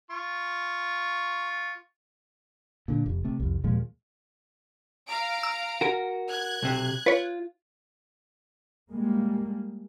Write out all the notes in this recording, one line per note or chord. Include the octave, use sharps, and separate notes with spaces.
F4 C#6
A#2 D3
F1
C3 A3
C2 F2
D#2 A#2 F3 G#3
F5 A#5 D7
E6
F#4 A#4
F#6 G#6
B1 C3
F4 B4 C#5
G3 G#3 A#3